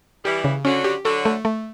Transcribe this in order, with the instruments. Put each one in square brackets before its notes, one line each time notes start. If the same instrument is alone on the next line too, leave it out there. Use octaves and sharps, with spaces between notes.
[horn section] E3 G3 [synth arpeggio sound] G4
[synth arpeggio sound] C#3
[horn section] D3 F#3 [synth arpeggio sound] C#4
[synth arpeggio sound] G4
[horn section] D3 F#3 [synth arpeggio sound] A4
[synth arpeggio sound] A3
A3